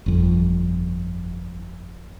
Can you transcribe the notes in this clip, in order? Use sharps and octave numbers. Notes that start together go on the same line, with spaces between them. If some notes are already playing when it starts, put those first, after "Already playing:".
G1 F2